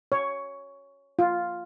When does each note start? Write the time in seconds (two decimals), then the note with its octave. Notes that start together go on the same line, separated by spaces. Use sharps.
0.12 C#5
1.19 F4